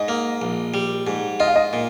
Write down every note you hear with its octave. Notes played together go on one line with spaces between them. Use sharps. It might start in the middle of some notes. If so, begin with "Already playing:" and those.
Already playing: G#2 D#5
A#3
A#1
G3
G#2
F4 D#5
F5
D#5
A#2